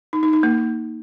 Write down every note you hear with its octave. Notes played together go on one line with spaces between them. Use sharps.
D#4
D#4
D#4
A#3